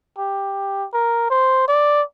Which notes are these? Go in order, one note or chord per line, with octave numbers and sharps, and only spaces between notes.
G4
A#4
C5
D5